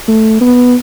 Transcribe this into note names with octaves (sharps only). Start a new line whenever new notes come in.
A3
B3